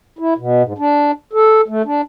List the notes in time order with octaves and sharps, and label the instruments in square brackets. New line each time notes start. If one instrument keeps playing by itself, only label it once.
[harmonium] E4
B2
G#2
D4
A4
A3
D4